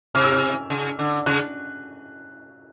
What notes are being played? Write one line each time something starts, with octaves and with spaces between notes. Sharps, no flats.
C3 F6
E6
F6
C#3
D3
C#3 F#6